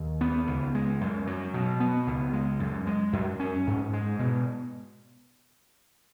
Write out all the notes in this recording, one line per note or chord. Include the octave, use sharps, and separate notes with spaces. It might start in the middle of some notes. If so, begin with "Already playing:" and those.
Already playing: D#2
B3
C#2
G#3
F#2
F#3
B2
B3
C#2
G#3
F#2
G#3
F#2
C#4
G#2
G#3
B2